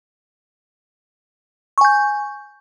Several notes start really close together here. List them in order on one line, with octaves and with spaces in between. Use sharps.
C#6 G#5 G6